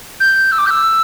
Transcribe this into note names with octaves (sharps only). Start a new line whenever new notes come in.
G6
E6
D6
G6
E6